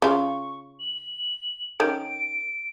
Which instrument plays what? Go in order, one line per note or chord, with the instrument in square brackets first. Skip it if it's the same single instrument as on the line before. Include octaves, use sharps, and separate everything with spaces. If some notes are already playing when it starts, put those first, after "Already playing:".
[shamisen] C#3 F4 [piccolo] C#6
[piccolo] F#7
[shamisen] D#3 C#4 [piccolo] D7